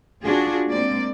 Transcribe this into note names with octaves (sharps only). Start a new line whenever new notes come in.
D4 F4 F#4 G#4
G#3 A#3 C4 D5